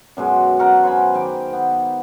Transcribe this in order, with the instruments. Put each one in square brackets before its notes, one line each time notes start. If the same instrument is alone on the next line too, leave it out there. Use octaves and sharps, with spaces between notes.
[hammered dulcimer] F#2 B2 G#3
A4 A#4 F#5 C#6
C5 F#5 G#5 B5
D#3 G5 D6
B3